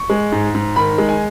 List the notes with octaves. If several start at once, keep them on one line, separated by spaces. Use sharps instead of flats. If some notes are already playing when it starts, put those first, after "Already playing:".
Already playing: C#6
G#3
G#2
G#2
D#3 B5
G#3
G#5